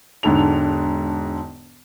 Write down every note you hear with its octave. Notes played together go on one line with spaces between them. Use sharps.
E1 G#2 D3 A4 F7